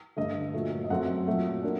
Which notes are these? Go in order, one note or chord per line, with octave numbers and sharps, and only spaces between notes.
G2 D3 A3 D#5
A#2 F#3 A3
D#5
F#2 F#3 A3 C4 F#5
A#2 F#3 A3
A#3 D4